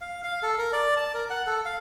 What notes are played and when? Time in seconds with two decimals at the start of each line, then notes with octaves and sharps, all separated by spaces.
0.01 F5
0.23 F5
0.43 A4
0.58 A#4
0.73 D5
0.97 A5
1.14 A#4
1.30 F#5
1.47 A4
1.65 F5